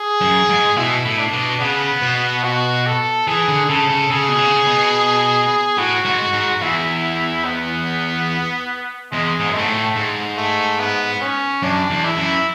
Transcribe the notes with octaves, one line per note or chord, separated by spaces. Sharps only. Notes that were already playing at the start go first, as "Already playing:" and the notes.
Already playing: G#4
F#2
G#2
B2 E4
A2
D4
B2
C#3 B3
B2
F#4
A4
E3 G#4
D3
C#3 A4
C#3
C#3 G#4
B2
C#3
B2
A2 F#4
G#2
G#2
E2 E4
B3
E2 G#3
G#2
F#2
G#2 A3
A2
G#2
A3
B3
C#4
F#2 D4
E2
E4
F#2